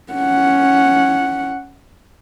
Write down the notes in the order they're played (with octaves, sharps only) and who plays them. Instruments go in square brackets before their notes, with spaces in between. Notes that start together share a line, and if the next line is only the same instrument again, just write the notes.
[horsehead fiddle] C#4 F#5